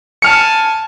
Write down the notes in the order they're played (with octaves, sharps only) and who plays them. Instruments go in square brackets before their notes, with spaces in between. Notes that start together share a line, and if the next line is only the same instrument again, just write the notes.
[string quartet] G#5 A5 [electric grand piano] F6 C#7